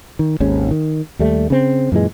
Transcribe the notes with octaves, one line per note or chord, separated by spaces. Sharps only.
D#3
G#1 D#2 G#2 C#4
D#3
D#2 G3 A3
C#3 C4
F#2 A#2 E3 G#3